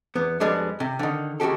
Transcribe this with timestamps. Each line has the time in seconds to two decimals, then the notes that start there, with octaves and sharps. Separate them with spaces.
0.15 E2 B3
0.40 F2 G3 G#3 B3 D4
0.80 C3
0.99 D3 D#3
1.40 D#2 C#3 F#4 G4 A4